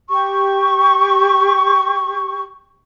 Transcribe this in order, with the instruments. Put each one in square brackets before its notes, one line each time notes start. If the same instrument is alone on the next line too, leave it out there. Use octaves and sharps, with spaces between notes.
[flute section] G4 C#6